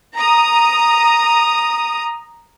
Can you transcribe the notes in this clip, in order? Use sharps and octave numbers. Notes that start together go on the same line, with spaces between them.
A#5 D#6